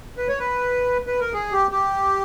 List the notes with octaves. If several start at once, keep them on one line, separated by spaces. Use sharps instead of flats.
B4
C#5
B4
B4
A#4
G#4
G4
G4